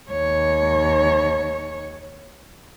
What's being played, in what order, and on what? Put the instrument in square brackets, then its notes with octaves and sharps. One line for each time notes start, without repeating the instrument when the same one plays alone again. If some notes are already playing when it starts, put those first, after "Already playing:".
[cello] D#2 C#5